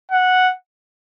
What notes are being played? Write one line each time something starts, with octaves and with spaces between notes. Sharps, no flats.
F#5